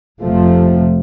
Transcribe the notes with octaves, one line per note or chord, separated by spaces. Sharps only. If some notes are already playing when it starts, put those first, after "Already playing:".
F1 F2 C3 F3 A3